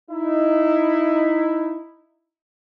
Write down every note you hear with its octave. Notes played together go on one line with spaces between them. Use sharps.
D#4 E4